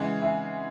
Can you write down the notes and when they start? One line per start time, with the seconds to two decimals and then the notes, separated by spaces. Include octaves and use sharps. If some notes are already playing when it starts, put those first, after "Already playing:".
Already playing: C#3 E3 G#3 D#5 F#5
0.22 E5 G#5